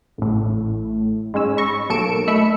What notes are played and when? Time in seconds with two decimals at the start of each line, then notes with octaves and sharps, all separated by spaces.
0.18 A1 A2
1.34 G#2 G#3 C#4 E6
1.57 B5 C#6 A#6
1.90 B1 A#3 A4 C#7 D7 E7
2.28 A3 D#5 E5 B5 C#7 E7